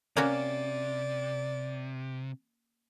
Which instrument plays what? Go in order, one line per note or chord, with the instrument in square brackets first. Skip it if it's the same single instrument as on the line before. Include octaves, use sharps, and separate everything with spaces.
[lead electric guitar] C3 [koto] A#3 C#4 F#4 [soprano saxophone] D5